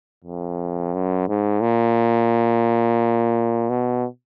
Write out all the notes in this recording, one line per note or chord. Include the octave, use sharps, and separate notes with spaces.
F2
F#2
G#2
A#2
B2